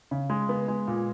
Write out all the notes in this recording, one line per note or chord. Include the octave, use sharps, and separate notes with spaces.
C#3
G#3
B3
G#3
A#2